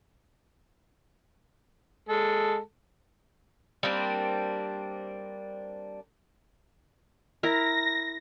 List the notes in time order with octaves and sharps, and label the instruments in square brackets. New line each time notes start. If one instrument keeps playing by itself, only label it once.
[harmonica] G#3 A4
[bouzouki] G3 A#3 C4 D4
[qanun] E4 A#4 [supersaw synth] A#6